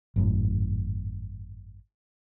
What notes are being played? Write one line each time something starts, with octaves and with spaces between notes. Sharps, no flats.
G#1 F#2 A2